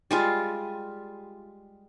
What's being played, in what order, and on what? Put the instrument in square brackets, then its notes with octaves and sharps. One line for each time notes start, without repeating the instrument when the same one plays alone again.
[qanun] G3 G#3 F4